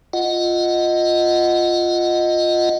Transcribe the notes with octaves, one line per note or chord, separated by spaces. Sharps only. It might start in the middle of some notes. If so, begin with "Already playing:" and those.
F4 D#5 F#5